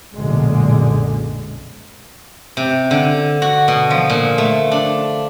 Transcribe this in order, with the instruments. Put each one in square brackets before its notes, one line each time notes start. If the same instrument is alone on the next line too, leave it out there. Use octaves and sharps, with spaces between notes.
[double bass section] B1 F#2 A#2 D3 G#3
[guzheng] C3
D3
F#4
B2
F3
A#2
A3
D4